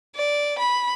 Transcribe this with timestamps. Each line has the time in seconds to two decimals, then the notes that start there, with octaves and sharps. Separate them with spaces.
0.16 D5
0.59 B5